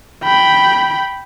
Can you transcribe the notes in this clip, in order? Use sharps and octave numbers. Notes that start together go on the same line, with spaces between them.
G5 B5